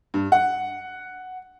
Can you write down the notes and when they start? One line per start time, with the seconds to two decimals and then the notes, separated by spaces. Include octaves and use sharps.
0.14 G2
0.32 F#5